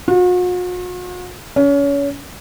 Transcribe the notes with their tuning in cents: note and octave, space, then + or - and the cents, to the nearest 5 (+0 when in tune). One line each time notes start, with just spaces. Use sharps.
F#4 -45
C#4 +30